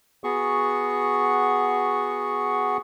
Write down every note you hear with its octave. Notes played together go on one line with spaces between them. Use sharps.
B3 F#4 G#4 C#6